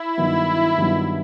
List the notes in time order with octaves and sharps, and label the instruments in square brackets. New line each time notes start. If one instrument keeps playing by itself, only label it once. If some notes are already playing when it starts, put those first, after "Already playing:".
Already playing: [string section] E4
[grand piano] G2 D#3 F#3 B3
G2 D#3 F#3 B3